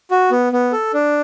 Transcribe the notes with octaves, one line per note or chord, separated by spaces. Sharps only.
F#4
B3
B3
A4
D4